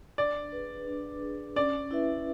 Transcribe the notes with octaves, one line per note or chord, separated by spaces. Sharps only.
D4 D5
G#4 B4
D4
G#4 B4
C#4 D5
E4 B4 E5